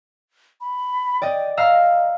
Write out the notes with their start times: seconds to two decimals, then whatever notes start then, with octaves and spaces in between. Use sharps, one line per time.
0.61 B5
1.22 D5 D#5 G5
1.57 D#5 F5 A#5 E6